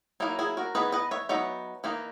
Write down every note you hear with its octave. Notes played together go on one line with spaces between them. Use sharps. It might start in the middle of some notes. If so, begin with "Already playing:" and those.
F#3 A#3 D#4 E4
E4 G#4
F#4 A#4
E3 B3 D#4 G#4 B4
B4 D#5
C#5 E5
F#3 B3 D#4 C#5 E5
E3 A#3 D#4